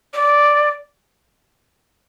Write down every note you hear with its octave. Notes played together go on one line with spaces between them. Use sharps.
D5